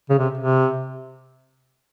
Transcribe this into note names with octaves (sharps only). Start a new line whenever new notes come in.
C#3
C3
C3